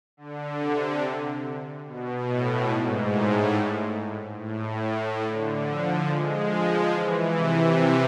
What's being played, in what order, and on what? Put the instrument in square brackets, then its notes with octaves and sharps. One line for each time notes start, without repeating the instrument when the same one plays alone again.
[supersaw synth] D3
C3
B2
A2
G#2
A2
A2
D3
F3
G#3
F3
E3
C3